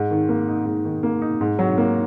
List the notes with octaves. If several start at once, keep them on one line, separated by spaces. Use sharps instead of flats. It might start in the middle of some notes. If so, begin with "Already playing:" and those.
Already playing: G#2
D#3
A#3
D#4
G#2
D#3
A#3
D#4
G#2
F#3
A#3